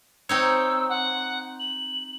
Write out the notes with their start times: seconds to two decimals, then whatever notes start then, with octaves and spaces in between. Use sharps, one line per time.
0.29 C4 D#4 C#5 E6
0.89 F#5
1.59 F#7